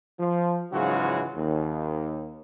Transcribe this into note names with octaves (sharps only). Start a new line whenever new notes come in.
F3
G#2 C#3 E3 F#3 F4 F#4
D#2